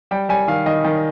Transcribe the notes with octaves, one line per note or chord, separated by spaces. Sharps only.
G3 G5
G3 G#5
D#3 F5
D#3 D#5
D#3